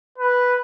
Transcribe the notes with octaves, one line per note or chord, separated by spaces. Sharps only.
B4